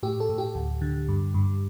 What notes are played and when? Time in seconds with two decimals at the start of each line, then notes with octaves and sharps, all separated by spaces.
0.03 A2 G4
0.20 A4
0.30 A2
0.38 G4
0.55 D2
0.81 D3
1.08 G2
1.34 G2